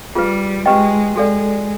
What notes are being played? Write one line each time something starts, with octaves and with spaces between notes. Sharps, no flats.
G3 F4 G#4 B4
G#3 G4 B4 D#5 G5
G#3 F#4 A4 D5